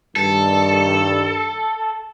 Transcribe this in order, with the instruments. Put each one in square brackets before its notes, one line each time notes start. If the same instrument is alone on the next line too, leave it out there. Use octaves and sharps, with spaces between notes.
[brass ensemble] G2 D#3 G3 [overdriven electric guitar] A4